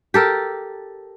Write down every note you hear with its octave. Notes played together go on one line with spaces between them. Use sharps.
G4 A4 A#4